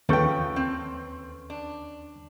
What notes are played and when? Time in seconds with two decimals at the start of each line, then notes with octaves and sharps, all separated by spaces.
0.09 D#2 F3 C#4 A4 B4 G5 C#6 G6
0.56 C4
1.50 D4